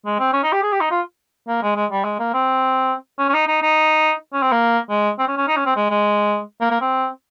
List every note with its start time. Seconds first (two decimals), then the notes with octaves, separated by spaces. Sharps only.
0.06 G#3
0.19 C4
0.33 C#4
0.43 D#4
0.52 G4
0.63 G#4
0.72 G4
0.81 D#4
0.91 F4
1.48 A#3
1.62 G#3
1.76 G#3
1.91 G3
2.04 G#3
2.19 A#3
2.33 C4
3.19 C#4
3.29 C#4
3.34 D#4
3.47 D#4
3.62 D#4
4.33 C#4
4.42 C4
4.52 A#3
4.90 G#3
5.19 C4
5.28 C#4
5.38 C#4
5.48 D#4
5.56 C#4
5.66 C4
5.76 G#3
5.90 G#3
6.61 A#3
6.71 A#3
6.81 C4